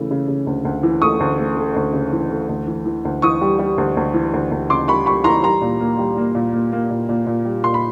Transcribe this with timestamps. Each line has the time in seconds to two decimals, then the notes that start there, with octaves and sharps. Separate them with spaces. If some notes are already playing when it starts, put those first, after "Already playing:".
Already playing: C#3 E3 A3
0.11 C#3
0.28 C#3
0.47 D2
0.65 D2
0.83 E3
1.02 A3 C#6 D#6
1.20 D2
1.39 A3
1.57 A3
1.76 D2
1.93 C#3
2.12 E3
2.30 A3
2.49 D2
2.67 E3
2.86 E3
3.05 D2
3.22 E3 C#6 D#6
3.41 G3
3.59 G3
3.78 D2
3.97 D2
4.14 E3
4.34 D2
4.52 D2
4.70 C#3 C6 D6
4.88 G3 B5 C#6
5.06 G3 B5 C#6
5.24 E3 A#5 C6
5.43 G3 A#5 C6
5.61 A#2
5.80 A#3
5.99 G3
6.17 A#3
6.35 A#2
6.53 A#3
6.72 A#3
6.90 A#2
7.09 A#2
7.27 A#2
7.45 G3
7.64 A#2 C6
7.74 B5